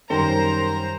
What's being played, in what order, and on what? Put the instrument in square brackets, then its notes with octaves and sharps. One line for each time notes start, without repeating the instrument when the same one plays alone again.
[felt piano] F#2 D#3 G3 [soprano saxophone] A#4 [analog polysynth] C5 [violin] A#5